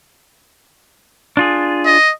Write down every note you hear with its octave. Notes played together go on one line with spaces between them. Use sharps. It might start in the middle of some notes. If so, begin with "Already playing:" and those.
D4 F4 G#4
D#5